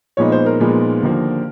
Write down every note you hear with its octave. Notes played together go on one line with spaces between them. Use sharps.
A#2 F3 G#3 B3 D#4 C#5
C5
A#4
A#2 F3 G#3 B3 D#4
D#2 D3 F3 A#3